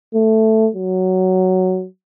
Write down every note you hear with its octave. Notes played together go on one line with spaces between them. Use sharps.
A3
F#3